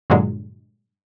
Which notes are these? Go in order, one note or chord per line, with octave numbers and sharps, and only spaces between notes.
G2 A#2 D3 F#3 G#3